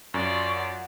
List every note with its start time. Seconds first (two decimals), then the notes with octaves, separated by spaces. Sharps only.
0.14 F#2 F4 D5 C#6
0.55 F#5